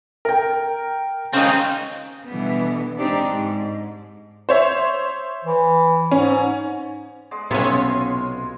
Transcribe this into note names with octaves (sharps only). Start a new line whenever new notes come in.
A#4 G5
C#3 C4 D#4
B2 D3 E3 G3 B3
G#3 C4 D4 D#4 G4 D5
G#2
C5 C#5 E5
E3
G#2 C#4
G#3 B3 D5
B1 C3 B3 C#4 E4 F4 C#5 B5